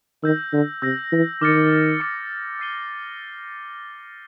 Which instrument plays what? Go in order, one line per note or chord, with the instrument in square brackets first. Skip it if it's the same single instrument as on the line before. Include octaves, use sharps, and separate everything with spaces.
[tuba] D#3 [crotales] E6 G6 A#6
[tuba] D3
[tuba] C3 [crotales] E6 G6 A#6
[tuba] E3
[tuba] D#3 [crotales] D6 F6 A6 C#7
[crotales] D6 F6 A6 C#7
E6 G6 C7 D#7 G7